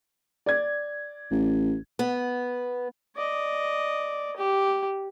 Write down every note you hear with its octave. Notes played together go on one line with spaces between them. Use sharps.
D5 G#6
A1
B3
D5 D#5
G4